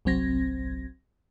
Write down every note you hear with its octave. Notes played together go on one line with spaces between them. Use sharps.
G1 C2 F#3 C4 G#6 A#6